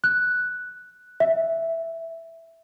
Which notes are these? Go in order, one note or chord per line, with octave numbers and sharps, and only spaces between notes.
F#6
E5